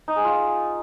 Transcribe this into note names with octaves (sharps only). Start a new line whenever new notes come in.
D#4
G#4
F4